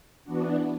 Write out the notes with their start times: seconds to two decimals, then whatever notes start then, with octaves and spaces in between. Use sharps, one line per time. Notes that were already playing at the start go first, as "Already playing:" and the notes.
0.25 E3 B3 D4 F#4